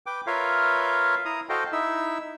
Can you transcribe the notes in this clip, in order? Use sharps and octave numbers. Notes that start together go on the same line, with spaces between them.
B4 G5 D6
F4 A#4 B4 C#5 E5 F5
E4 A#5 D#6
F#4 A4 C5 D#5 F5 G5
D#4 E4 E5 E6